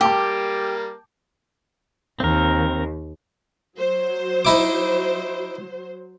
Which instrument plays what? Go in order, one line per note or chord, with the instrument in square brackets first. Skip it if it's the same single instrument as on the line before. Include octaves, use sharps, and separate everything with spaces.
[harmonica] G3 A#3 [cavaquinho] G4 [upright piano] G5 A5 D6
[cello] D#2 [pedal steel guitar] C4 A#4
[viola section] F#3 C5
[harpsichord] D#4 E4 D6